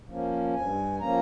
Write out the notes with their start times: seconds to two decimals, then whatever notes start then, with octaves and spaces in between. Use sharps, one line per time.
0.08 F3 A#3 C#4
0.54 G2 G#5
1.00 F3 A#3 C#4 A#5